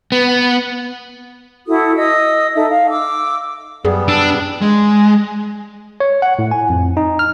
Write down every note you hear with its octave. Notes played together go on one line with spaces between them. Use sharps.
B3
E4 F#4 A4 D#6
D#5 D#6 E6
D#4 A4 E5
F5
D6 E6
F#2 G3 B3 G#4
D4 E6
G#3
C#5
F#5
A2
G#5
F2
D#4
F6